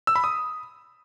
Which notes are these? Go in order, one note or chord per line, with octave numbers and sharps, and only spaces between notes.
E6
B5
D#6